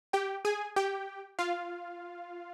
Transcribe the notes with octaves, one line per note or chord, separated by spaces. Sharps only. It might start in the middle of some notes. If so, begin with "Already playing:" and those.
G4 G5
G#4 G#5
G4 G5
F4 F5